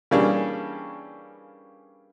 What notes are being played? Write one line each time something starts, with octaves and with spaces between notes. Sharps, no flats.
C#3 E3 G3 A#3 C#4 D4